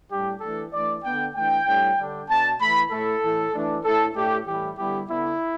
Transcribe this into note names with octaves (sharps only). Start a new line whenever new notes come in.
A2 G3 D4 G4
E3 A3 D4 A4
E3 A3 D4 D5
D3 B3 D4 G5
E3 A3 D4 G5
A2 G3 D4
D3 G3 D4
B2 B3 D4 A5
E3 A3 E4 B5
A2 A3 E4 A4
A2 E3 A3
E3 A3 D4
A2 A3 E4 A4
A2 A3 D4 G4
A2 E3 G3 E4 G4
D3 G3 B3 E4 G4
D3 B3 D4 E4